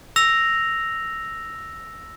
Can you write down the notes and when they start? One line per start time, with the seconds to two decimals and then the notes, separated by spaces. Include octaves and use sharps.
0.16 E6 A#6 F7